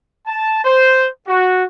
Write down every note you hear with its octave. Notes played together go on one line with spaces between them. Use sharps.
A5
C5
F#4